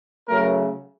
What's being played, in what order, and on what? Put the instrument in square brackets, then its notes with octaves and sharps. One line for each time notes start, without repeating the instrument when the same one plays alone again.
[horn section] C#3 F#3 A3 A#4